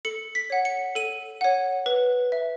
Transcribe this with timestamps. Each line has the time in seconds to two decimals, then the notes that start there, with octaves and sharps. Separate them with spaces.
0.05 A4 C#7
0.35 B6
0.50 C#5 F#5
0.65 C#7
0.95 A4 D#7
1.41 C#5 F#5
1.86 B4
2.32 E5